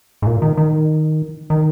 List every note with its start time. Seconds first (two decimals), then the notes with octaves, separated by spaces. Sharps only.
0.22 G#2
0.26 A#2
0.42 D#3
0.57 D#3
1.50 D#3